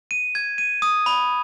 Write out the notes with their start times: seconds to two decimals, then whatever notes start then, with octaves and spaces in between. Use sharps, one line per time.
0.11 D#7
0.35 G#6
0.58 D#7
0.82 D#6
1.06 B5